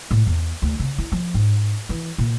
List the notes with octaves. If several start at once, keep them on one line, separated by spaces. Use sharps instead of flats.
A2
E2
D2
C#3
E4
F3
G#2
E3
A#2